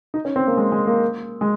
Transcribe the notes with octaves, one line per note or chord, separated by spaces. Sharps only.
D#4
C#4
C4
A#3
G#3
G#3
A#3
G#3